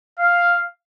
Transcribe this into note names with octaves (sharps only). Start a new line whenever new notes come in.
F5